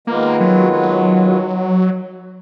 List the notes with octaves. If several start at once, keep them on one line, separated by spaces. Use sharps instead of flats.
D#3 G#3 A#3 B3 F4 B4
F#3
F#3